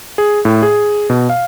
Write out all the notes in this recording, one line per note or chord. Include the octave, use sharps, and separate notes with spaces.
G#4
A2
G#4
B2
F5